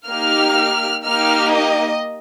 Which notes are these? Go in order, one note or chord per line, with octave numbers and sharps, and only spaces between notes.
A#3 D#4 G4 F6
A#3 D#4 G4 F6
D#5